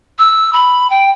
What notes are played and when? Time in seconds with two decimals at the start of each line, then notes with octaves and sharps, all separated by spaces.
0.19 E6
0.53 B5
0.90 G5